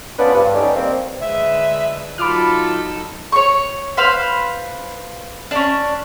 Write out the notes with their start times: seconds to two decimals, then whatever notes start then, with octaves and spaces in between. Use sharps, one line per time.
0.18 B3 C#4 D4 F4 B4 C5
0.34 G2
0.54 D3 G3 C#4 D#4 G4 B4
0.75 D#3 G3 A#3 C4
1.20 D3 G#3 B4 E5
2.18 F#3 D#4 F4 A4 B5 D6 F6
3.32 C#5 C#6
3.97 B4 C5 F5
5.51 C#4 D4